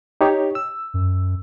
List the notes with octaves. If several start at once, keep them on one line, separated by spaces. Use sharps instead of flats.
D#4 G4 C#5
E6
F#2